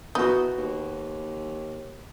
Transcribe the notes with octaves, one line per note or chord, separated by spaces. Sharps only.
E3 B3 D#4 F#4
D#2